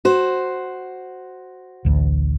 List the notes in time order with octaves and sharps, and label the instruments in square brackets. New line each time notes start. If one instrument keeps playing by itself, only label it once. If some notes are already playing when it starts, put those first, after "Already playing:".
[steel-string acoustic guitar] F#4 C5
[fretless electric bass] A1 D2